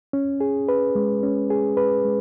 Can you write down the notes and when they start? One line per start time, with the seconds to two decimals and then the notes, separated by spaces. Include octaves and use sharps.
0.13 C#4
0.41 G#4
0.69 B4
0.95 G#3
1.23 C#4
1.50 G#4
1.77 B4
2.05 G#3